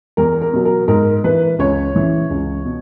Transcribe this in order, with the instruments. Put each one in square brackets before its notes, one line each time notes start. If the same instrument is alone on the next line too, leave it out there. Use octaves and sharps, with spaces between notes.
[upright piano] E2 A#4
A#4
B2 F#3
A#4
G#2 A#4
E3 B4
C#2 C#5
C#3 E3
C#2
B2